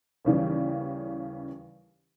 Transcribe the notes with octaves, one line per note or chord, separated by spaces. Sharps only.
D#2 C#3 E3 G3